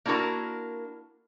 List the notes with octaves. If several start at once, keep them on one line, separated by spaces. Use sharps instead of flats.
A#3 D4 E4 F#4 A#4